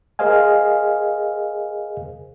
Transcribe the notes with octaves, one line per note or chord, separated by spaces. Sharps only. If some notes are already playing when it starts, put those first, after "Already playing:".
G#4 A#4 C5 D#5 F5 G#5